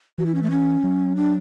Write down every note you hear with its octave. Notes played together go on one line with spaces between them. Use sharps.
E3 F#4
E4
C#4
A3
C#4
F#3
D4